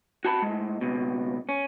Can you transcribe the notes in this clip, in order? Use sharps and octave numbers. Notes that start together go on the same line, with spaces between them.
F#4 A5 B5
A2 G#3
C#2 B2
C#4